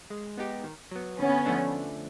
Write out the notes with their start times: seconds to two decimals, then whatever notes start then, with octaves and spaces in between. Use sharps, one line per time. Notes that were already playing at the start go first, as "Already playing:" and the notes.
0.10 G#3
0.38 B3 D#4 G4
0.64 D#3
0.91 F#3 B3
1.19 D3 B3 C#4
1.45 F3 A3 D4